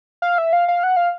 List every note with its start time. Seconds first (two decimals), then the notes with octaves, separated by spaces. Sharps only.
0.22 F5
0.38 E5
0.53 F5
0.68 F5
0.83 F#5
0.96 F5